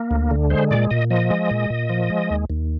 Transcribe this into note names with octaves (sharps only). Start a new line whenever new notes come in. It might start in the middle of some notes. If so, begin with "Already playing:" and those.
Already playing: A#3
D2
D3
G#3 C5
A#2 D5
A#2 D#5
F3 D#5
G#3
A#2
A#2
F3
G#3
D#2
D#2